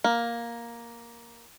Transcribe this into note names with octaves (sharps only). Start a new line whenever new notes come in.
A#3